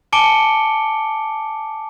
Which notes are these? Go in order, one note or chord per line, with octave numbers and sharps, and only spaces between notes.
G#5 A5 D6 C#7 D7 G7